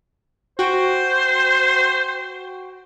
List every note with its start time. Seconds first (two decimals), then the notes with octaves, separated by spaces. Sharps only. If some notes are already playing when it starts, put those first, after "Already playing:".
0.59 F#4 C5 G5